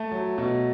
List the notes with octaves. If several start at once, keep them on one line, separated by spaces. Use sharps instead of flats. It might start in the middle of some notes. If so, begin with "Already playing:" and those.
Already playing: A3 A5
F#3
B2